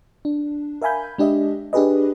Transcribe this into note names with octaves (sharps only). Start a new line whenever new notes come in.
D4
A#4 E5 F5 G#5 B5 G6
G#3 D4 G4 D#5 E5
D4 G4 G#4 B4 D#5